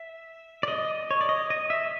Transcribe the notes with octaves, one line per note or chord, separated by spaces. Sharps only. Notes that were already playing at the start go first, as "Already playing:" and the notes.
Already playing: E5
D5
D#5
C#5
D5
D#5
D#5
E5